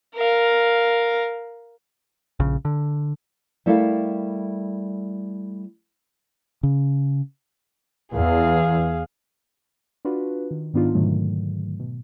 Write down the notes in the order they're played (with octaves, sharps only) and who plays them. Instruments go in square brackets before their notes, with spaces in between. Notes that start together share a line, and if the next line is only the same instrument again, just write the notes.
[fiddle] A#4 F5
[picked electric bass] A#1 C#3
D3
[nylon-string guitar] G3 A3 E4 A4 A#4 F5
[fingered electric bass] C#3
[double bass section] E2 [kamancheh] G#4 F5
[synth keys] D4 F4 F#4 B4
D#3
G#2 D#3 B3 D4 D#4 F4
G#2 B2 D3 D#3 F#3 A3
B2